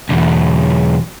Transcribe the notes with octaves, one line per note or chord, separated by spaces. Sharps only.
B1 E2